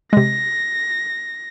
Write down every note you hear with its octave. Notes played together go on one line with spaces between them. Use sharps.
C3 G#3 A#6